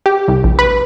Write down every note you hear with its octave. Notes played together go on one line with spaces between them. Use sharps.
G4
C2
A#1
B4